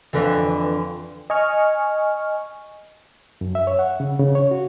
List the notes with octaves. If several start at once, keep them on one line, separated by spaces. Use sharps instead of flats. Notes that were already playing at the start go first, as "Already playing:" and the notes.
F2 D3 E3
D#5 G#5 C#6 F6
F#2
E5
C#5
F#5
C#3
C#3
C#5
F#4